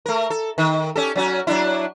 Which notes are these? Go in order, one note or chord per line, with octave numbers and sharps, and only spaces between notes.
A3 A#4
A4
D#3
C#4 G4 A4
F#3 C#4 F#4
F#3 D4 E4